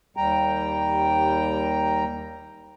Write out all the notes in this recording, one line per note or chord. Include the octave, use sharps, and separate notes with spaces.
D#2 G3 G5 A#5